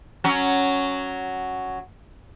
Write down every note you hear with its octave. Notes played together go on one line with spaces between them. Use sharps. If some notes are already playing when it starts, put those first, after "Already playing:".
F#3 C#4